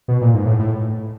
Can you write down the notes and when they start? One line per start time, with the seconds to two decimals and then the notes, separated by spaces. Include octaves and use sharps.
0.08 B2
0.21 A#2
0.34 G#2
0.46 A2
0.59 A2